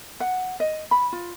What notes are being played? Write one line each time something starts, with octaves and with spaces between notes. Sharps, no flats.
F#5
D#5
B5
F4